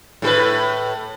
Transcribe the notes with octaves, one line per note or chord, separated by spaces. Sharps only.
A2 G#4 B4